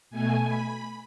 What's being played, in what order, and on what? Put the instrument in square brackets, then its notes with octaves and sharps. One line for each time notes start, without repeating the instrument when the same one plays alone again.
[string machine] B2 A3 G#5
B5